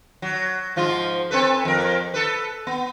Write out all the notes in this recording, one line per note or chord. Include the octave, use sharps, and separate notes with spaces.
F#3
G#2 F3 F4
C4 A4 B4
F2 A#4
A4 B4
B3